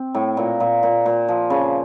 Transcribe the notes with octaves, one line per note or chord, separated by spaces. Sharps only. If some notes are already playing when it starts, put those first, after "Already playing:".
Already playing: C4
A2
A#2
A#2
A#2
A#2
F3
C#3